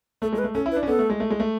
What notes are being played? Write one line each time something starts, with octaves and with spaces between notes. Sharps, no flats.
A3 A4
G#3 A4
B4
A3
C#4 A4
E4
B4
D4
C#4
B3 A4
A3
G#3
A3
G#3
A3